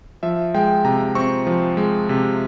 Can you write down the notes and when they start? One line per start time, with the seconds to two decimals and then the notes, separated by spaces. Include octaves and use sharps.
0.23 F3 E5
0.54 G#3 G5
0.84 C3 A#5
1.15 C4 C#6
1.47 F3
1.77 G#3
2.09 C3